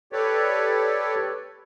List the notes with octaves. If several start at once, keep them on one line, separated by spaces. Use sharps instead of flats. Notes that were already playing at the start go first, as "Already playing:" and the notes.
G4 A4 B4 C#5 D5